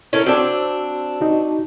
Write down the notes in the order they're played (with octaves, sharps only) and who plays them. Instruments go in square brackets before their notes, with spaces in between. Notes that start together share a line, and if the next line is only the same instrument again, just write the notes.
[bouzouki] C#4 A4 A#4 [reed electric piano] E4
[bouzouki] C4 D4 [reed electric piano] F#4 E6
[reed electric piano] D#4 F#4